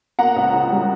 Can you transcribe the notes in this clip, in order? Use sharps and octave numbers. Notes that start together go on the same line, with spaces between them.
A#3 F#5 A#5
C#2
C#3
G3